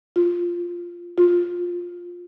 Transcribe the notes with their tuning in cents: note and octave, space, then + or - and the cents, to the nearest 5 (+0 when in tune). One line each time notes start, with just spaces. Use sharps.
F4 -5
F4 +10